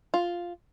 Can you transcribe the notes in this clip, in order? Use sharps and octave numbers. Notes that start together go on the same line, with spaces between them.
F4